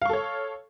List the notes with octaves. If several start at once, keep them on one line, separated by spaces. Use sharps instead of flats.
A4 C#5 F5 C#6